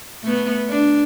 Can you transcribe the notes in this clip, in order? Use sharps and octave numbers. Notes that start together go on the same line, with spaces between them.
A3 B3
D4